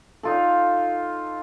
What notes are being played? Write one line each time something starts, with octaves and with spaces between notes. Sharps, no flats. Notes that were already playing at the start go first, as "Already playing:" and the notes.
D#4 F4 A4